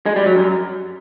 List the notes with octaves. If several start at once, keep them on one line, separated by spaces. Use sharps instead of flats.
G#3
G3
F#3
F#2